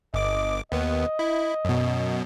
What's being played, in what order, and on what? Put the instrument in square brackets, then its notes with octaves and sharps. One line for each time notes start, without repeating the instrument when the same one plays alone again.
[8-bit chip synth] G1 D6 [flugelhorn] D#5
[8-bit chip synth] D#2 B3 [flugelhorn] D#5
[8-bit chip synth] E4
F#2 B2